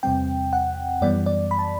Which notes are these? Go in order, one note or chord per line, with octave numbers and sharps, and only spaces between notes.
E2 C3 G3 C4 G5
F#5
F#2 E3 G3 B3 D5
D5
B5
A5